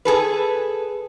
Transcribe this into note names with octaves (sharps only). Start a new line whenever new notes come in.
G#4 A4 B4